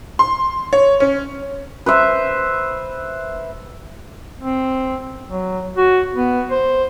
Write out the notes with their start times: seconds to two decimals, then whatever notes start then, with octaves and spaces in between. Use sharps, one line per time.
0.19 C6
0.73 C#5
1.00 C#4
1.86 B4 C5 E5
4.41 C4
5.29 F#3
5.77 F#4
6.14 B3
6.51 C5